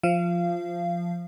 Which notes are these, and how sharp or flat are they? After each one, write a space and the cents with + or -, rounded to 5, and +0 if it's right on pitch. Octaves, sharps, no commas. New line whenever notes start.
F3 +0 F5 -25